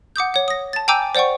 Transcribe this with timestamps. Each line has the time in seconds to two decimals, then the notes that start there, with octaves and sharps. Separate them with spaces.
0.16 F#5 D6 D#6 G6
0.34 C#5 F#5
0.48 D#6 A#6
0.73 A5 A6
0.88 G5 G#5 A#5 D6 E6 G6
1.15 C5 D5 F#5 G5 C#6